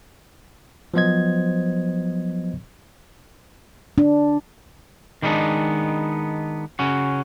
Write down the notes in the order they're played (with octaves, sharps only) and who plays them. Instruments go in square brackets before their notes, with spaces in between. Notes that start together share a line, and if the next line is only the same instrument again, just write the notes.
[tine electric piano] F3 F#3 B3 C5 D#5 G#6
[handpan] D4
[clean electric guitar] D#3 G3 G#3 B3 D4 D#4
C#3 C#4 F#4